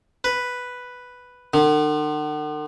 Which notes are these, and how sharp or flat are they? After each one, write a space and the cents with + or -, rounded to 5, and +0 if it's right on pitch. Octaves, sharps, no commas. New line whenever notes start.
B4 +0
D3 +45